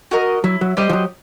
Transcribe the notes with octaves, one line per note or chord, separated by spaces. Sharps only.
F#4 A#4 D#5
F#3 E4
F#3
G3 G4 C5 D#5
F3
F#3